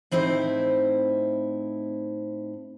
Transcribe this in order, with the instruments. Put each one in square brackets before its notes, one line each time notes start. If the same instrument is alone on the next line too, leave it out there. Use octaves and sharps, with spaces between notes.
[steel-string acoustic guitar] A2 C4 D#4 E4 C5